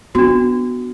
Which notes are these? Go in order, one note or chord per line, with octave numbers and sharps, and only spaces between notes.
B3 D4 F#4